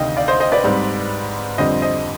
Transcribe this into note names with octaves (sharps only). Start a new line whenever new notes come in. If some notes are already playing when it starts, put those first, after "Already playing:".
Already playing: D2 C3 D#3 D#5 F5 G5
D5 F5
C5 D#5
C5 D#5
B4 D5
G#2 G3 C4
F2 D3 G3 C4 C5 D#5
C5 D#5